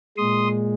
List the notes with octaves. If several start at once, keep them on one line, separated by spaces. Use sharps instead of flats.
A#2 G#3 C6 D#6